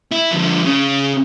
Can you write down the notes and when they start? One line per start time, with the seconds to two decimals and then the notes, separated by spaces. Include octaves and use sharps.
0.12 E4
0.32 D3 F3
0.65 C#3